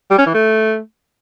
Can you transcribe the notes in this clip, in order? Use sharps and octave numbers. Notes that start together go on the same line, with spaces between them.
G3
C#4
E3
A3